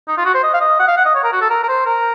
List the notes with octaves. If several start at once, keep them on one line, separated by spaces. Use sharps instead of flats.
D#4
F4
F#4
C5
D#5
F5
D#5
F#5
F5
F#5
D#5
C#5
A#4
F#4
A4
A#4
A#4
C5
A#4